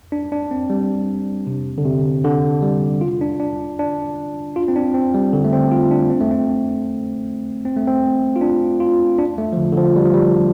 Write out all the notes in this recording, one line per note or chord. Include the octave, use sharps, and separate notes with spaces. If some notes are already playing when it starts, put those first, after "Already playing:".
D4
D4
C4
G3
C3
D3
C3
D3
G3
F4
D4
D4
D4
F4
C4
D4
C4
G3
D3
A3
C4
F4
D4
C4
A3
C4
C4
A3
C4
F4
D4
F4
D4
A3
F3
D3
D3
F3
G3
F3
G3